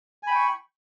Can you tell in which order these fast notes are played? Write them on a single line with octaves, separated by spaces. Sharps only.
G#5 B5 G5 C#6